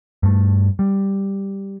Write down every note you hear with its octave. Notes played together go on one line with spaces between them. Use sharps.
G2 A3
G3